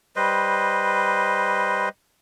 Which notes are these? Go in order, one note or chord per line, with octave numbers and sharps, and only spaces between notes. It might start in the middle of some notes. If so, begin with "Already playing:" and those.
G3 B4 C5 D#5